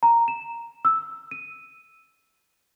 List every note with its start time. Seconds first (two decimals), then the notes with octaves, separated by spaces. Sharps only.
0.03 A#5
0.28 E7
0.85 E6
1.31 D#7